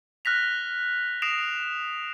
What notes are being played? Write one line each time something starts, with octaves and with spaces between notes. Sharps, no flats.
F6 F#6 A#6 B6 F7
D#6 A#6 C7 D7 E7 F7